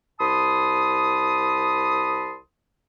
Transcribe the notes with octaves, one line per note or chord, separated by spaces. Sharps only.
C2 A5 B5 C6 D#6